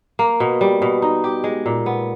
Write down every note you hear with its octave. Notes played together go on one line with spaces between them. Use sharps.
A#3
B2
G3
B2
D#4
G4
G#3
A#2
B3